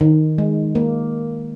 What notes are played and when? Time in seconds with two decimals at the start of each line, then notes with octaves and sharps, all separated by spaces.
0.01 D#3
0.38 G#3
0.75 A#3